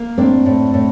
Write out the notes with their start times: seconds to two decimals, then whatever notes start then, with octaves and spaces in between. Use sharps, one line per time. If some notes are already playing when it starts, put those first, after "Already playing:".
Already playing: A#3
0.18 A2 C4 D4
0.46 A2
0.74 A2